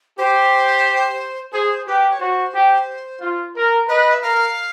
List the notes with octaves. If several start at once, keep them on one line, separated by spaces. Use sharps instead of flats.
G4 C5
G#4 C5
G4 B4
C#5
F#4 C5
G4
F4
A#4
B4 D#5
E5
A#4 F5